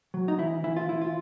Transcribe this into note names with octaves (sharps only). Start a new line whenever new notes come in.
F#3
D#4
E3 E4
E3 E4
F4
E3 E4
F4